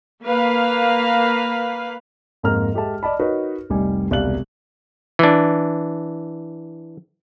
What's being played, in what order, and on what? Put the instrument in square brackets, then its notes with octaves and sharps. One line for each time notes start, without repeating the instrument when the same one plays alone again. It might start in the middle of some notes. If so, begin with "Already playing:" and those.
[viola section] A#3 B4 F5
[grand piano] F2 G#2 A#3 A#5 F6
G#3 G4 A4 E5 A5
D5 D#5 A5 B5
D#4 F#4 A#4 B4 C#5
F1 C2 G3 D#4 G#5
E1 C2 D5 F5 F#6 F#7
[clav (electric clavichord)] E3 D4